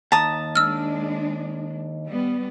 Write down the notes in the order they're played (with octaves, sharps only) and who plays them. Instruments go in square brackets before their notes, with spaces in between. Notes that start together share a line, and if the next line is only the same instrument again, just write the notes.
[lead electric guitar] D#2 [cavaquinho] A5 D#6 [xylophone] A#5
[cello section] G#3 D4 [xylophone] E6 F6
[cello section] G3 B3